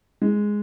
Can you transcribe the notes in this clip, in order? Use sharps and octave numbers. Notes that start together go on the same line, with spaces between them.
G#3